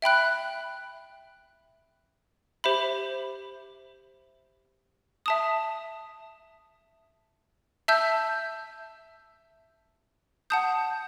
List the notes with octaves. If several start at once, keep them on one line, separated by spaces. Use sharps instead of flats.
E5 G5 B5 F#6
G4 C5 E5 B5
E5 A5 D#6
E5 A5 E6 G6
F#5 A5 D#6 G6